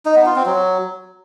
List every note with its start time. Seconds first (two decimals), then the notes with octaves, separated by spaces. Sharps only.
0.06 D#4
0.16 B3
0.26 F4
0.36 C4
0.46 F#3